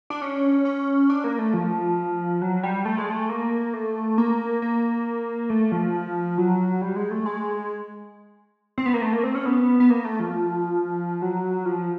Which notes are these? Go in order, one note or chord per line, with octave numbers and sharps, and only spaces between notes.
D4
C#4
C#4
D4
A#3
A3
F3
F#3
G3
A3
G#3
A3
A#3
A3
A#3
A#3
A3
F3
F#3
G3
G#3
A3
G#3
C4
B3
A#3
A3
A#3
C4
C#4
B3
B3
A#3
A3
F3
F#3
F3